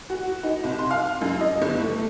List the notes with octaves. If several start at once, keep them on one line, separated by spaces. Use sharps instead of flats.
F#4
D#4
C2
C6
F5
F#2
D#5
G1
A3